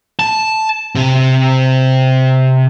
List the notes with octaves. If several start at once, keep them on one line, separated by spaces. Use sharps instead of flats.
A5
C3